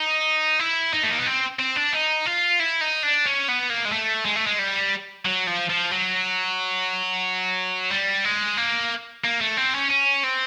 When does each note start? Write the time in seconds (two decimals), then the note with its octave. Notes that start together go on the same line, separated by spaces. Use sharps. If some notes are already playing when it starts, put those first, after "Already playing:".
Already playing: D#4
0.59 E4
0.93 D#4
1.03 A3
1.11 A#3
1.19 B3
1.26 C4
1.59 C4
1.76 D4
1.93 D#4
2.25 F4
2.60 E4
2.81 D#4
3.03 D4
3.26 C#4
3.48 B3
3.70 A#3
3.85 G#3
3.92 A3
4.25 G#3
4.36 A3
4.46 G#3
4.59 G3
5.25 F#3
5.47 F3
5.69 F3
5.91 F#3
7.91 G3
8.25 G#3
8.57 A#3
9.24 A#3
9.41 A3
9.57 C4
9.74 C#4
9.91 C#4
10.24 C4